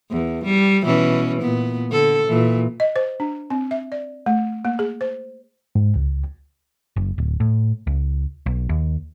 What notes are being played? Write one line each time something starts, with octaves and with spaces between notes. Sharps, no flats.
E2
G3
B2 E3 C#4
A#2 B3
D3 A4
A#2 E3
D#5
C5
D4
C4
E5
D5
A3
A#3
G#4
C5
G#2
C#2
F#1
D1
A2
C#2
B1
D#2